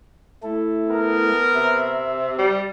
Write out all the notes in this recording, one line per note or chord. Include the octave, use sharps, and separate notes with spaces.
A3 E4 A4
B3 A#4
C3 E5
G3